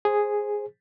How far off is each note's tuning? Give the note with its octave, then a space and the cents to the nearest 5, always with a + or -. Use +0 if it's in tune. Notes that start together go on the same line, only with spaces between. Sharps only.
G#4 +0 C5 +10